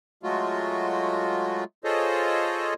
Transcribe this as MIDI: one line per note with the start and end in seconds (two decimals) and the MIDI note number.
0.23 1.64 54
0.23 1.64 56
0.23 1.64 57
0.23 1.64 65
0.23 1.64 66
1.84 2.74 65
1.84 2.74 68
1.84 2.74 69
1.84 2.74 72
1.84 2.74 73
1.84 2.74 75